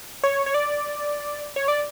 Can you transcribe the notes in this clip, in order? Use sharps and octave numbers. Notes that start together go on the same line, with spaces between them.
C#5
C#5
D5
C#5
D5